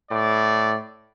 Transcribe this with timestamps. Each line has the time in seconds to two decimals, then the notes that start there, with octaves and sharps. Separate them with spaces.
0.11 A2 D5